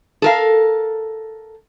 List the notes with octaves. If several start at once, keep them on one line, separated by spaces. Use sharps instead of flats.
A4 A#4 F5